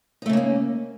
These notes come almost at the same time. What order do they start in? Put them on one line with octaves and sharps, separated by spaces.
D#4 A3 C#3 A#3 C#4